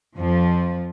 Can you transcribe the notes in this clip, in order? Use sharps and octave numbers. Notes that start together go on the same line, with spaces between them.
F2 F3